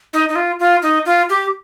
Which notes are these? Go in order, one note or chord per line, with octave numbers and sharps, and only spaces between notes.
D#4
D#4
F4
F4
D#4
F4
G4